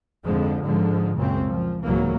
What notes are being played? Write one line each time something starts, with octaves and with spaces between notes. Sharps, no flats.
G#1 F2 D3 F3 G#3
G#2 D3 F3 G#3
C#2 F#2 A#2 C#3 C4 C#4
A#2 F3
C2 G#2 C#3 E3 F#3 A#3